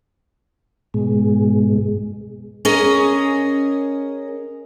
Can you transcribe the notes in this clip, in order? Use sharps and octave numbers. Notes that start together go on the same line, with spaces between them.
G#2 B2 G#3
C#4 G#4 A#4 D#5